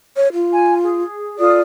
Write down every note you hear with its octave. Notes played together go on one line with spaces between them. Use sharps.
C#5
F4
G#5
G#4
F4 A4 D5 D#6